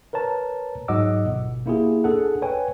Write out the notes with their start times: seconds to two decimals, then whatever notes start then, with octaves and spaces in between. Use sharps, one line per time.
0.13 A#4 B4 C#5 A5 A#5
0.88 G#2 F#3 D#5 F#5 D6 E6
1.26 G1 B2
1.66 A#3 B3 E4 F4 G4 G#4
2.04 D4 G#4 A4 F#5
2.42 B4 C#5 G5 G#5